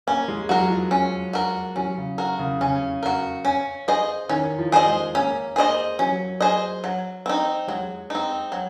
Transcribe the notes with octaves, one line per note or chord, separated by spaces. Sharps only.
A#3 C#4
G#3
F#3 F#4 A#4
F3
C#4
F#4 A#4
F#3 C#4
C#3
F#4 A#4
C#3
C#3 C#4
F#4 A#4
C#4
G#4 C5 D#5
D#3 C#4
F3
G#4 C5 D#5
G#3
A#3 C#4
A#3 G#4 C5 D#5
F#3 C#4
G#4 C5 D#5
F#3
C4 D#4
F#3 G#3
C4 D#4
F#3